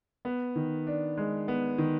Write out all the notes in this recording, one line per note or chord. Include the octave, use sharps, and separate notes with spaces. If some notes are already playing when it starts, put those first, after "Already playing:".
B3
D#3
D4
G#3
B3
D#3